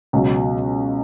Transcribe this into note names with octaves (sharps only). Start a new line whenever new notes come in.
C#2 B2 F#3